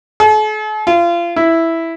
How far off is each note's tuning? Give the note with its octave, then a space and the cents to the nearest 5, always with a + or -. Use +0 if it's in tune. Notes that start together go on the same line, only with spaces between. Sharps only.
A4 -45
F4 -30
E4 +0